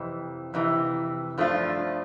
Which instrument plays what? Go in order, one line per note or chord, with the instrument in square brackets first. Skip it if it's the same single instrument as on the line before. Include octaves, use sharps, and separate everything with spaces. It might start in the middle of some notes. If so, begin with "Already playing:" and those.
Already playing: [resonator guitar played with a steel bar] F2 C3 E3
F2 C3 E3
G2 F3 A3 D4 F4